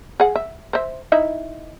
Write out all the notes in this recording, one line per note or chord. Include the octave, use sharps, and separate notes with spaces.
G#4 F#5
E5
C5 E5
D#4 E4 E5